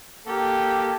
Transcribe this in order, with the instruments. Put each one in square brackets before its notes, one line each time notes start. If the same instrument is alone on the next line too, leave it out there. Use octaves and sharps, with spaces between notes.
[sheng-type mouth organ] A#3 A4 [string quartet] G4